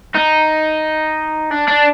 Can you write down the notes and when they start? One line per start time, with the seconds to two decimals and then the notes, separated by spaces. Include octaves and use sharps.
0.15 D#4
1.51 D4
1.68 D4